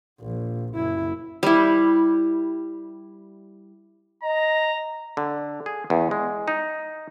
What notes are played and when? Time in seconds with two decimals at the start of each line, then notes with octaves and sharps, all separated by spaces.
0.21 A#1
0.75 F#1 E4
1.43 G3 E4
4.23 D#5 A#5
5.17 D3
5.66 G#4
5.90 E2
6.11 G#3
6.48 D#4